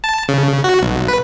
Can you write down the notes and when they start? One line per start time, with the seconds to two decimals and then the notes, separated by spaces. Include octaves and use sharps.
0.04 A5
0.29 C#3
0.64 F#4
0.81 B1
1.08 B4